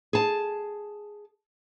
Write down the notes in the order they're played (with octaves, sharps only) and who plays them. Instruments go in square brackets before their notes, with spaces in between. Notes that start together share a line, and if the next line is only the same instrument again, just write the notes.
[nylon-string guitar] G#4 A5